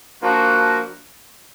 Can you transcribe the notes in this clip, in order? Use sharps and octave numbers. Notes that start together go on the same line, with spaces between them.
F3 A#3 D4 F#4